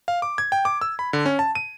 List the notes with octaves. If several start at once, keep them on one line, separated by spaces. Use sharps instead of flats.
F5
D6
G#6
G5
D6
E6
B5
D3
C#4
A5
D#7